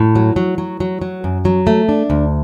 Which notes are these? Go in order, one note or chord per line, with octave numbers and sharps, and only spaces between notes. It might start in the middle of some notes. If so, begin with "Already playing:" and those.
Already playing: A2
F#3
F#3
F#3
F#3
F#3
F#2
F#3
A3
D4
D2